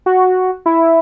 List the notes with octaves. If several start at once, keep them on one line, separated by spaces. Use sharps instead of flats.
F#4
E4